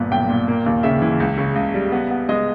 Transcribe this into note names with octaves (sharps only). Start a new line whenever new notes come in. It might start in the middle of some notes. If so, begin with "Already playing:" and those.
Already playing: G1 A#2 B3
B1 G5
A#2
A#3
D#2
C#3 E5
E3
C#2
C#3
C#2
G3
B3
B3
G#3 D#5